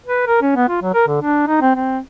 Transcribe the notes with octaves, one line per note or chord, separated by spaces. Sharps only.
B4
A#4
C#4
B3
F4
F#3
A#4
D3
D4
D#4
C4
C4